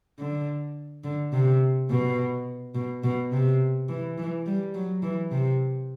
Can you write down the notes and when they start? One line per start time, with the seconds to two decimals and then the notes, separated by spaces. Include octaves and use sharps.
0.19 D3
1.04 D3
1.33 C3
1.90 B2
2.75 B2
3.03 B2
3.32 C3
3.89 E3
4.18 E3
4.46 G3
4.74 F#3
5.03 E3
5.31 C3